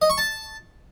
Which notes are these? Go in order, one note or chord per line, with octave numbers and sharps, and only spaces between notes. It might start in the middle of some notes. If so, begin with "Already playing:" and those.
D#5
C#6
A5